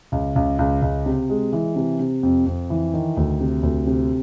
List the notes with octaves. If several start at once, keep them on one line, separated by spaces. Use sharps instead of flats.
C#2
C#2
C#2
C#2
C3
G#3
E3
C3
C3
F2
F2
E3
D#3
D2
C3
D2
C3